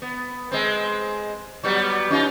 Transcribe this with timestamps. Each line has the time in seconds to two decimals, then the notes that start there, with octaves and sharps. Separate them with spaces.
0.02 B3
0.52 G#3 C4
1.63 F#3 G3 B3
2.10 C#4 D#4 F4